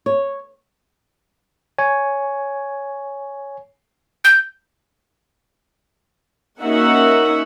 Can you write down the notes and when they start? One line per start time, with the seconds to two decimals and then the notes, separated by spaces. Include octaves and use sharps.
0.06 C#5
1.78 C#5 G#5
4.24 G6
6.61 A#3 C#4 D#4 F#4 E5 F#5